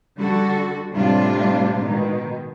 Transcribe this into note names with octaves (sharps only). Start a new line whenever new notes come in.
D3 G3 F#4 A4
A2 C3 G3 G#3 D4 F4
B2 D#3 G#3